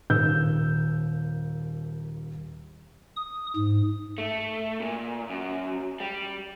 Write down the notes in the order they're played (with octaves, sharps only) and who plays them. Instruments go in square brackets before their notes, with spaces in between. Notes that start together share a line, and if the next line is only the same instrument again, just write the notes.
[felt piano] D#1 D#2 E6 G6
[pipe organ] D#6
G#2
[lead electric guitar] A3
A#2
F#2
G3